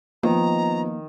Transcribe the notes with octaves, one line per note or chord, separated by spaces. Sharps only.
D#3 F3 A#3 B3 A#5